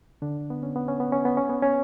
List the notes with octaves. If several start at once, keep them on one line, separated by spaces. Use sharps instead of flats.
D3 D4
B3
C#4
B3
C#4
B3
C#4
B3
C#4
B3
C#4